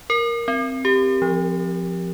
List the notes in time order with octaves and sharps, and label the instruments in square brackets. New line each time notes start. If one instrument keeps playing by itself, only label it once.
[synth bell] A#4
C4
G4
F3